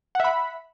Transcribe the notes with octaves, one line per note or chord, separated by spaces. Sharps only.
E5 F#5 B5